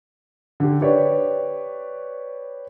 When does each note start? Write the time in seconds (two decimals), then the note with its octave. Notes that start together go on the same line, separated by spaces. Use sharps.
0.60 D3 G4
0.81 G4 B4 C#5 D5